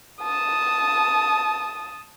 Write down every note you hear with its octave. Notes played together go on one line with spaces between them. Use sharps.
A5 D#6